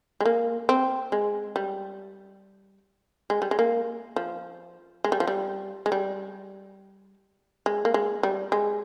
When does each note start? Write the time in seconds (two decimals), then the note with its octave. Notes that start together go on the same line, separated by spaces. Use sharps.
0.20 G#3
0.25 A#3
0.69 C4
1.12 G#3
1.56 G3
3.30 G#3
3.42 G3
3.51 G#3
3.59 A#3
4.16 F3
5.04 G#3
5.12 G3
5.20 F3
5.27 G3
5.86 G#3
5.92 G3
7.66 G#3
7.85 A#3
7.94 G#3
8.23 G3
8.52 G#3